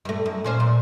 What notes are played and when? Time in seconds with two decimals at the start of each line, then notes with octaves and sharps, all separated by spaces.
0.05 G2 A3
0.26 F#2
0.44 A#2 C#4 C5
0.60 A#2